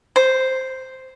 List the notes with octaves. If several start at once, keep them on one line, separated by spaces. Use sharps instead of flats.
C5